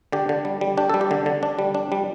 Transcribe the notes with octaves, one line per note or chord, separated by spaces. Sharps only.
D3 G4
D3
G3
G3
D4 G4
G3 A4
G4
D3
D3
D4
G3
D4
G3